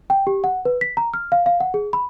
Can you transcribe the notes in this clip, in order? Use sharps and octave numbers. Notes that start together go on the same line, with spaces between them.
G5
G4
F#5
B4
B6
A#5
F6
F5
F5
F#5
G#4
B5